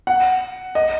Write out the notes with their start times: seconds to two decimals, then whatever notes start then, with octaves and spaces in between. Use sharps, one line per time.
0.07 F#5
0.75 D#5